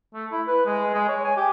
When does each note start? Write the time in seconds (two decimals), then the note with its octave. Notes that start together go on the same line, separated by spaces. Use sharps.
0.14 A3
0.31 E4
0.48 B4
0.66 G#3
0.94 G#3
1.08 C#5
1.24 G#5
1.37 G4